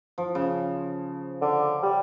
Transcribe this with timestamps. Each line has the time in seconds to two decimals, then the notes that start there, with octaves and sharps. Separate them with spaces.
0.18 F3
0.35 C#3
1.42 D3
1.83 G3